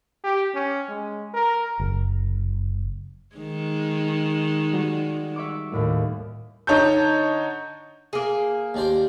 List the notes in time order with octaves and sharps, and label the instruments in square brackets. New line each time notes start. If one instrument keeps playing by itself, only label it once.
[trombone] G4
C#4
G#3
A#4
[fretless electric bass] F#1
[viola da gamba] D#3 G#3
[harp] G3 F#4
E5 C#6 D6
D#2 A2 A3
[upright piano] D3 D#4 C#5 A5 G6
[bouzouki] A#3 G#4
[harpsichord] D#2 D4 C5